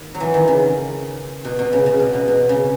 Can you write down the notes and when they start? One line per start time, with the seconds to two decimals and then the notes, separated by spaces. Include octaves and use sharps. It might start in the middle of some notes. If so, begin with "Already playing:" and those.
Already playing: D#3
0.15 F#3
0.20 E3
0.34 D#3
0.48 C#3
1.45 B2
1.59 B2
1.73 C#3
1.86 C#3
2.00 B2
2.13 B2
2.28 B2
2.49 C#3